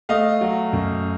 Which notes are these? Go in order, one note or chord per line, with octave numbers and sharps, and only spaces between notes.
A3 D#5 F5
F#3
F#2